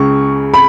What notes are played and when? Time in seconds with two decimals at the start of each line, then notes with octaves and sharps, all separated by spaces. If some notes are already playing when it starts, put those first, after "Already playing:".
Already playing: C#2 C#3 C#6
0.54 B5